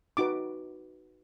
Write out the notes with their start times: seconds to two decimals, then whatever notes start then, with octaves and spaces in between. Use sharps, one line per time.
0.17 D#4 F#4 B4 D6